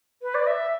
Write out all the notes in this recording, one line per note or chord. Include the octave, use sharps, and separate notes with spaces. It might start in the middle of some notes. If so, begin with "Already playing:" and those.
B4
D5
E5